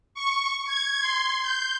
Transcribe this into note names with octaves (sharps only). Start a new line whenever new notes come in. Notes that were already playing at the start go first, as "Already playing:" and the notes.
C#6
G#6
C6
G6